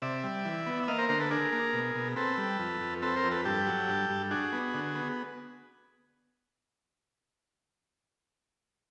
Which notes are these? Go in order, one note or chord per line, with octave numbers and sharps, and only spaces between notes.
C3 D5 E5
G3
E3
B3
E5
A#3 D#5 F5
A#4 C5
D3 A#4 C5
A4 B4
D4 G#4 A#4
A#3
B2
B2
C4 A4 B4
G3
F2
F2
C4 A4 B4
A#4 C5
F2
A4 B4
G2 G4 A4
F#3
G2
G2
D4 F#4 G#4
B3
D3
B3